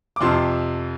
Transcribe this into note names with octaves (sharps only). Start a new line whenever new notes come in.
D6
F2 C3 F3 A5 C6